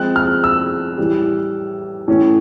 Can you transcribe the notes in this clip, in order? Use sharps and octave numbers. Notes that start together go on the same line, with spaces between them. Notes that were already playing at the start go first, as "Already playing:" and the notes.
Already playing: F3 G#3 C4 F#6
F6
E6
A2 E3 G3
A2 E3 A3 C#4